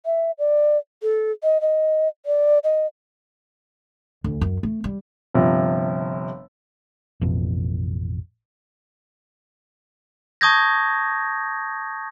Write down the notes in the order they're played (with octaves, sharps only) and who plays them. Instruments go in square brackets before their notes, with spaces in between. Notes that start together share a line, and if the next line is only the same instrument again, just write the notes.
[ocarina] E5
D5
A4
D#5
D#5
D5
D#5
[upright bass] D2
F#2
A3
G3
[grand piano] G1 C3 F3
[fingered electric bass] A1 F2 B2
[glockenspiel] A5 C#6 D#6 G6 G#6 A#6